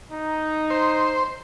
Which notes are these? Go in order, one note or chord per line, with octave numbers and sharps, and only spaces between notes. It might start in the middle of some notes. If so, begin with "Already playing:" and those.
D#4
C5